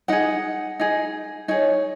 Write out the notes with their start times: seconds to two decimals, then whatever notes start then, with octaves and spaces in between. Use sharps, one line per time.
0.08 D#4 G#4 F#5
0.80 D#4 G#4
1.48 D#4 G#4 C#5